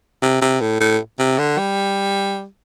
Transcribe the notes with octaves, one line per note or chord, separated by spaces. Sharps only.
C3
C3
A2
A2
C3
D3
G3